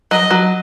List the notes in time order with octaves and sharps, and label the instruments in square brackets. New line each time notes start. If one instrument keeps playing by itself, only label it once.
[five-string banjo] F#3 [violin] D#5
[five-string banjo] F#3